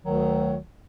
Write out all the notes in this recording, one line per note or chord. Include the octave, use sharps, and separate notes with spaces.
D2 D#3 F#3